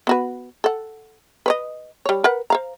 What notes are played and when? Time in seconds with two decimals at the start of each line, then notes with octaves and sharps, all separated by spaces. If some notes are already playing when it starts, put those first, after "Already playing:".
0.07 B3 F#4 B4
0.64 A4 F#5
1.46 B4 C#5 D#5
2.05 G3 C#5
2.24 A#4 B4 F#5
2.50 C5 F5 A#5